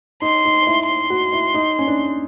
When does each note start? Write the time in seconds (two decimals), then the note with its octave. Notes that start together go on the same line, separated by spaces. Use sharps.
0.22 D#4 C6
0.45 D#4
0.67 E4
0.88 C6
1.10 F#4
1.32 E4
1.54 D#4
1.79 C#4
1.88 D4